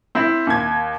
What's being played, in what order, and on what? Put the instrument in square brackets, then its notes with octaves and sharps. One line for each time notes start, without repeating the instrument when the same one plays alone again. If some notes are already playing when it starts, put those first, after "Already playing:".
[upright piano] C4 E4
D#2 G#6